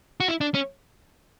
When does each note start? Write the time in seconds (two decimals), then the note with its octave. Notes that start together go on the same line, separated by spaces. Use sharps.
0.20 F#4
0.28 E4
0.41 D4
0.54 C#4